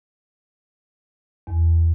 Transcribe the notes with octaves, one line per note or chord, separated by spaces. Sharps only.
E2